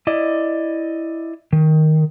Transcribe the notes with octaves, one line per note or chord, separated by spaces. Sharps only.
E4 D5 D#5
D#3